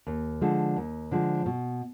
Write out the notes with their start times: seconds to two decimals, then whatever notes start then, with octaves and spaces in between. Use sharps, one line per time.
0.07 D#2
0.41 D3 F3 G#3
0.76 D#2
1.11 D3 F3 G#3
1.46 B2